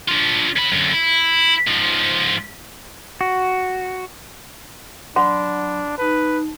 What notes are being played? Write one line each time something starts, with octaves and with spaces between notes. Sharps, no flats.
D4 F4
C#3 B5
F#2 D3
E4
G#2 F3
F#4
F#3 D4 D5 F#5 B5 C6
D#4 B4 A5